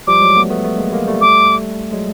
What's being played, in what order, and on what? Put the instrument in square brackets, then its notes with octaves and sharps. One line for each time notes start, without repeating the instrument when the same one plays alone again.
[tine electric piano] F3 G3 [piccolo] D6
[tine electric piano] F#3 G#3
A3 B3
A3 B3
A3 B3
G#3 A#3
G#3 A#3
G3 A3
[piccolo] D6
[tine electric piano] F#3 G#3